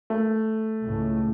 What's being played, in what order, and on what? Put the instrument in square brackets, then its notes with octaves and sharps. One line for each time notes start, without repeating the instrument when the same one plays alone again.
[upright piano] A3
[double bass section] C#2 A2